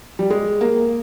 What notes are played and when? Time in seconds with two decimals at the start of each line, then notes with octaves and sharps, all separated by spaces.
0.19 G3
0.30 G#3
0.61 A#3